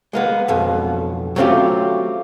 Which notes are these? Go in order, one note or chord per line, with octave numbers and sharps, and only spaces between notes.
G#3 A#3 B3
B1 F2 B2
F#3 A3 C4 C#4 F4 G4